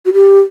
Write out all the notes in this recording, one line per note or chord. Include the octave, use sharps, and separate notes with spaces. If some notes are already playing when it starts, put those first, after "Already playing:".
F#4
G4